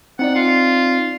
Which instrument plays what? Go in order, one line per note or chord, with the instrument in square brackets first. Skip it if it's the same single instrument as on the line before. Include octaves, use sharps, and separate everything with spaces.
[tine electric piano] C4 D#4 D5 [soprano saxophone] F#5
[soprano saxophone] F4